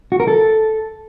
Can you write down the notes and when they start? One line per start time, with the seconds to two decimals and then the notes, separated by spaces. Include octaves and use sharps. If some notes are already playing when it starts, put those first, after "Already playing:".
0.12 F#4
0.20 A#4
0.28 A4